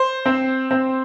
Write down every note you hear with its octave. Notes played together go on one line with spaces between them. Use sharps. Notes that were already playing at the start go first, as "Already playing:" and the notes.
Already playing: C5
C4
C4